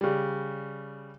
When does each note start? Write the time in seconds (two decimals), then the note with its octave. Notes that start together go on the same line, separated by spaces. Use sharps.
0.01 C#3 G3